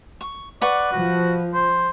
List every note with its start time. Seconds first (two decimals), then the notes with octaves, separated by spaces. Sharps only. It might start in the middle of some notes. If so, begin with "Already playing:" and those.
0.21 C#6
0.62 B4 D5 F#5 C#6
0.93 F3 F#4
1.54 C5